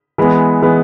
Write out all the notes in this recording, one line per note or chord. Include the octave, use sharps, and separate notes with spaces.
E3 G#3 B3
E3 G#3 B3